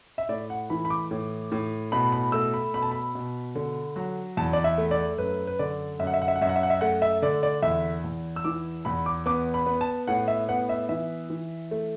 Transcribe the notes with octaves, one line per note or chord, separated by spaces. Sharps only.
E5
A2 D5
F#5
E3 B5
B5
D6
A2
A2
B2 B5
B5
A3 E6
B5
B2 B5
A5
B5
B2
D3
F#3
E2 A5
D5
E5
A3
D5
F#2 B4
B4
D3 D5
F#2 E5
F#5
E5
F#5
E5
F#5
F#2 E5
F#5
E5
F#5
E5
A3 F#5
E5
D3 D5
D5
E2 E5
E2
E6
E3 D6
E2 B5
D6
B3 D6
B5
B3
A5
A2 F#5
E5
B3 F#5
E5
E3 E5
E3
A3